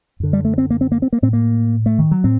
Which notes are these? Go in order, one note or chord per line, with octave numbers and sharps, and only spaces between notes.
F#2 D3
G3
A3
C4
A#3
C4
A#3
C4
A#3
A2 C4
A#3
A3
D#3
F#3
A2 C4